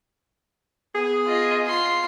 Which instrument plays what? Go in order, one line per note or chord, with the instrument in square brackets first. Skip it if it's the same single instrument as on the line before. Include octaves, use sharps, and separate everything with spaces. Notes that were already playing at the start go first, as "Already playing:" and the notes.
[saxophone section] B3 G#4
[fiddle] F4 D#5
F4 C6